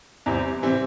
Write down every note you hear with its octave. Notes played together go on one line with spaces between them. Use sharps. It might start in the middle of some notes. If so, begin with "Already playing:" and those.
E2 C3 E3 G3 C4
C3 E3 G3 C4